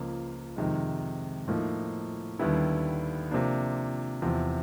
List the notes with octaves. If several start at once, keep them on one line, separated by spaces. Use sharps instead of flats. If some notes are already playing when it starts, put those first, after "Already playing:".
Already playing: C#2 C#3 F3 A#3
F2 C3 D#3 G#3
A2 F3 A#3 D#4
D#2 D3 G3 B3 E4
C3 F3 A#3 D4
E2 C3 F3